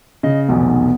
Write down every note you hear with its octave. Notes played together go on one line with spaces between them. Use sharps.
C#3 D#5
F1 B1 E2 B3